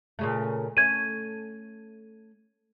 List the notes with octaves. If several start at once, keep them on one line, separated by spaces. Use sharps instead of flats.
A#2 C#3 A3
A3 C#4 G#6 D#7